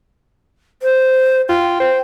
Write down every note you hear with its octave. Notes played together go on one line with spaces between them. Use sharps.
C5
F4 G5
C5